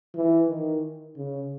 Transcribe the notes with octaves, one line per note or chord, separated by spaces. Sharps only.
E3
D#3
C#3